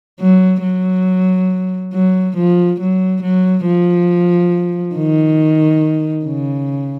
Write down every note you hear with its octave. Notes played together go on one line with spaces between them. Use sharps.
F#3
F#3
F#3
F3
F#3
F#3
F3
D#3
C#3